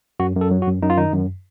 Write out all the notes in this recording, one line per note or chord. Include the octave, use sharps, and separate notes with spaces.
F#2 F#4
F#2
A4
F#3
F#4
F#2
F#2 D#4
F4
D#3 D#4
F#2